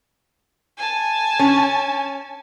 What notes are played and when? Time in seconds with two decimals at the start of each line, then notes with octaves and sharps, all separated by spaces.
0.77 G#5 A5
1.39 C#4